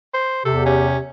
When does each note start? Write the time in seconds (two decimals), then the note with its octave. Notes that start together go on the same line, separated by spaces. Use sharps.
0.14 C5
0.45 E2 C3 G4 A4
0.66 C#4